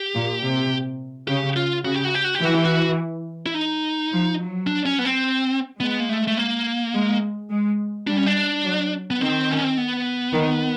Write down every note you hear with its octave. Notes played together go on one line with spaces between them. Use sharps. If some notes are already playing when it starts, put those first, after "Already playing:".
Already playing: G4
A#2
C3
C#3 G4
F4
C#3 F#4
G4
F#4
G4
F#4
G4
E3 F#4
G4
F#4
E4
D#4
F3
F#3
D4
C#4
B3
C4
G#3 B3
A#3
A3
A3
A#3
G#3
G#3
G3 D4
C#4
D4
F#3
B3
D#3 C4
C#4
C4
B3
D#3